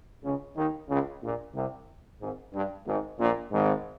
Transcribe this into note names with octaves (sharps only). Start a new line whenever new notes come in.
C#2 C#3
D#2 D#3
C#2 C#3
A#1 A#2
C2 C3
G#1 G#2
G2
G#1 G#2
A#1 A#2
G#1 G#2